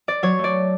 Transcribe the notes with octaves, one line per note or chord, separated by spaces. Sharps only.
D5
F#3 C#5
A3
D5